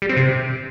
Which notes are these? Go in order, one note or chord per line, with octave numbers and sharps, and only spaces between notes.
G3
C4
C3